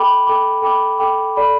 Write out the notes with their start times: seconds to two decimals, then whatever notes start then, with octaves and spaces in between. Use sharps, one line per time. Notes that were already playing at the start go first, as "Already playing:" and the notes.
Already playing: A4 G5 B5 D6
0.26 A4 G5 B5 D6
0.62 A4 G5 B5 D6
0.99 A4 G5 B5 D6
1.36 A4 D5 B5